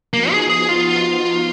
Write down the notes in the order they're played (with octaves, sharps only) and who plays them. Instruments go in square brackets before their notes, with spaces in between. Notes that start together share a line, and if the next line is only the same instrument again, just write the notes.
[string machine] F3 B3 D#4 F#4 [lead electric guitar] A#3
[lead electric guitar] G#4
G#4
F4